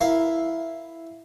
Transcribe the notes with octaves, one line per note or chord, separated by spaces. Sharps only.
E4 A#4 F5